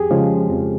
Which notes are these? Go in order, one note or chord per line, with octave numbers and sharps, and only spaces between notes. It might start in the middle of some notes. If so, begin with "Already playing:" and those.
Already playing: F2 G4 G#4
C#3 F3 G#3
F2